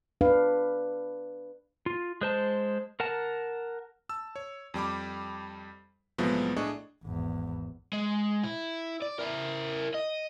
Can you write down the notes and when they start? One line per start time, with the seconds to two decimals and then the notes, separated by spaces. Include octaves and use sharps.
0.21 D4 B4 F5
1.86 F4
2.21 G#3 C5 A5
3.00 A#4 F#5 A5
4.09 A5 E6
4.36 C#5
4.74 F2 G3 B5 D6
6.18 C2 A2 F3 F#3 G#3 B3
6.56 A2 D4 G#4 D#5 C#6
7.03 G#1 E2
7.93 G#3
8.43 E4
9.02 D5
9.19 E4 A#4
9.94 D#5